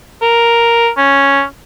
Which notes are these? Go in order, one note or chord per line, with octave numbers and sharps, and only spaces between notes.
A#4
C#4